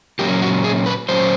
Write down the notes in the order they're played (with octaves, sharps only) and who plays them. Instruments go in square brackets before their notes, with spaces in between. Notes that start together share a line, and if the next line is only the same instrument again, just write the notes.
[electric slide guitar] A#2 F#3 A#3 C#4 G4
F#4
G#4
B4
A#2 F#3 A#3 C#4 C5